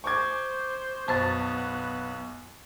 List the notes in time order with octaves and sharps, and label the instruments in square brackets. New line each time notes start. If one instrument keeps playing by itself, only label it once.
[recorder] C5 [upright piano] C#6 D6 G#6
[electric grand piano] B1 [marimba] F#2 C5 A5 [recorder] B3